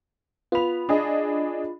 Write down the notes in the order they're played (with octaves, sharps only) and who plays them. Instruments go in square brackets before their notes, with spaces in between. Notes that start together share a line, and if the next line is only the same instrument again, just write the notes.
[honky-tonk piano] B3 F7 [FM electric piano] F4 B5
[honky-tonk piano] D4 G#4 D#5